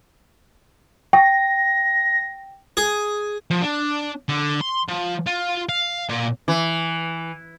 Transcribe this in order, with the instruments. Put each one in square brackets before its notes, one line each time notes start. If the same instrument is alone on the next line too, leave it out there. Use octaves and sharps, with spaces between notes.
[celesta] G5 [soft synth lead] A#6
[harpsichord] G#4
[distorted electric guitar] F3
D4
D3
C6
F3
F4
F5
A#2
[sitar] E3